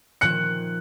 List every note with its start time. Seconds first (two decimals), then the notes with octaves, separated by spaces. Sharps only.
0.21 A#2 D#3 F3 F#6 C#7